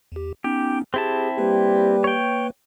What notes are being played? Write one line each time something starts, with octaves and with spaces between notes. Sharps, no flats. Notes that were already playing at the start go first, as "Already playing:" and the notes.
E2 G4
B3 C#4 D#4 G4
C4 E4 G4 G#4 A5
G3 A#3 G4 B4
C#5 G5